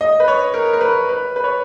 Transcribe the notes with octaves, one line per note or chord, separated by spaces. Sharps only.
D#5
B4
C#5
A#4
A#4
B4
B4
B4
C#5